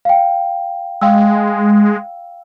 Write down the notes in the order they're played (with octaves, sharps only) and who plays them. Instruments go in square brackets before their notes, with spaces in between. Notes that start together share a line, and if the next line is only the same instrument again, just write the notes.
[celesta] F5 G5
[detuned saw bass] G#3 [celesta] F5 G5 E6